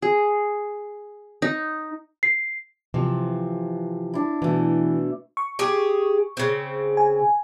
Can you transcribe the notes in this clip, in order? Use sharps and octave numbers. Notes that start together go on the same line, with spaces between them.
G#4
D#4
C7
C3 E3 F3
D4 E4
B2 E3 A3
C#6
G4 G#4
C#3 C4
G#5